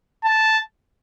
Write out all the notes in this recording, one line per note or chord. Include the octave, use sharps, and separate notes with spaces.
A5